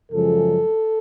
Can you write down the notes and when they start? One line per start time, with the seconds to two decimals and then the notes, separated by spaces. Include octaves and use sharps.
0.12 F#2 C#3 F3 G#3 A4